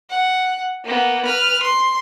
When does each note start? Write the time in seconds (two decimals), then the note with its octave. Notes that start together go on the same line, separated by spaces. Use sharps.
0.10 F#5
0.84 A#3 B3
1.25 B4 F6
1.63 C6